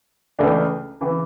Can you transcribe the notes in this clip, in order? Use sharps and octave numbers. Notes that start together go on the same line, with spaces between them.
C#2 C#3 E3 A3 D4
C#3 E3